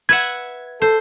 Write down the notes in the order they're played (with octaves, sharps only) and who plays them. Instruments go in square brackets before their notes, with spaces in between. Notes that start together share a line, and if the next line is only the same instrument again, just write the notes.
[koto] B4 E5 F#5 [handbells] G#6
[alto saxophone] A4 [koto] C5